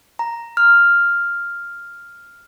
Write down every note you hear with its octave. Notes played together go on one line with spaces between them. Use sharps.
A#5
F6